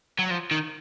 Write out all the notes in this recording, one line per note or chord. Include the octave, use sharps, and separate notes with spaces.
F#3
F3
D#3